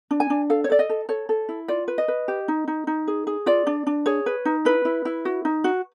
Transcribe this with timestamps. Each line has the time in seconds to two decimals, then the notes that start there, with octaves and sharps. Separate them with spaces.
0.11 D4
0.20 G#5
0.30 D4
0.50 A4 F5
0.64 C#5
0.70 A4 D5
0.79 D#5
0.89 A4
1.09 A4 C#5
1.29 A4
1.49 E4
1.68 F4 D5
1.88 B4
1.98 D#5
2.08 B4
2.28 G4
2.48 D#4
2.68 D#4
2.87 D#4
3.08 G#4
3.27 G#4
3.46 F4 D5
3.67 D4
3.87 D4
4.06 G#4 C#5
4.26 B4
4.45 D#4
4.65 E4 B4
4.85 E4
5.05 E4
5.25 F#4
5.45 D#4
5.64 F#4